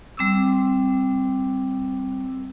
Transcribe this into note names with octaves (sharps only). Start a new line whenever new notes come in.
G3 C4 D6 E6